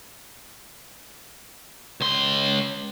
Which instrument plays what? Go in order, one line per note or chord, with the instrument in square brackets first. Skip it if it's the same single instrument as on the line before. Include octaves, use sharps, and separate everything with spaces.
[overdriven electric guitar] C#2 C6